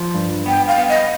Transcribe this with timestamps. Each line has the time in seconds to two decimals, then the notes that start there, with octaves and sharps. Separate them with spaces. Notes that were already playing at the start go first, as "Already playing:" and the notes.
Already playing: F3
0.15 G2
0.46 B3 G5
0.67 F5
0.78 B3
0.89 D#5